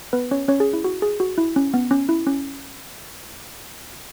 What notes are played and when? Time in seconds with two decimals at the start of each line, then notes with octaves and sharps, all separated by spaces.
0.13 B3 B4
0.31 C#4 C#5
0.48 C#4 C#5
0.60 G#4
0.73 E4
0.84 F#4
1.02 G#4
1.20 F#4
1.38 E4
1.56 C#4
1.74 B3
1.91 C#4
2.09 E4
2.27 C#4